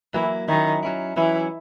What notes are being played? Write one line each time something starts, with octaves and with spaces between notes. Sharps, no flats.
E3 F#3 A#3 E4
D#3 F#3 C#4 E4
F#3 C#4 E4
E3 F#3 C#4 E4